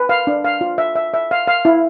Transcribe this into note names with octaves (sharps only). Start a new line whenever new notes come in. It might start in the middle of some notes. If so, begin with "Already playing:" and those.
Already playing: B4
F5
D4
F5
F4
E5
E5
E5
F5
F5
E4